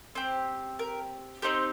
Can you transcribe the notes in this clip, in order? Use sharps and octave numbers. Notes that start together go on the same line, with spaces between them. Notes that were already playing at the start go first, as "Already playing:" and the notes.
C4 G4 C5
A#4
C4 D#4 G4 C5